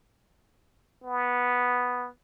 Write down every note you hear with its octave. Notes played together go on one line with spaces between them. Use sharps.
B3